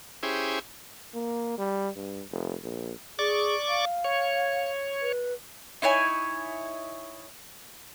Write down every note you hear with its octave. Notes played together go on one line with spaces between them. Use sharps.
C#4 E4 G4 G#4 C5
A#3
G3
G2
F1
A#1
G#4 D5 C#6 D6
F5
C#5
B4
D#4 E4 C#5 G#5